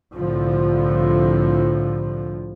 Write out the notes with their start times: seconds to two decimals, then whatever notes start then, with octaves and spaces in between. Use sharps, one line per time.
0.16 C2 A2 D3 F3